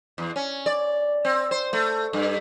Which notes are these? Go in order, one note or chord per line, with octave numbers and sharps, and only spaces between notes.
E2
C#4
D5
C4
C5
A3
G2